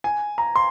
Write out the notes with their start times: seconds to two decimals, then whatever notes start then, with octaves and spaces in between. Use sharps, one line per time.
0.04 G#5
0.38 A#5
0.56 C6